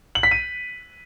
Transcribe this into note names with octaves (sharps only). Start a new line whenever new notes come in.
F#7
B6
D#7